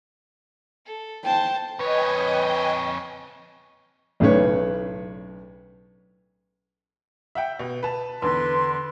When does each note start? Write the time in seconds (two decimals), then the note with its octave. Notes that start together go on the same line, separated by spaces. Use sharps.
0.86 A4
1.25 C5 G5 A5
1.79 F2 B4 C#5 D#5 G5 G#5
4.20 B1 A2 C#3 D4 B4 C#5
7.35 E5 F#5 G5
7.59 B2
7.83 B4 A5
8.22 E2 D3 B4 C6